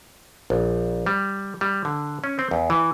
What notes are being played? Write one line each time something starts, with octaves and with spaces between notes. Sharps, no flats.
A#1
G3
G3
D3
C#4
C4
E2
E3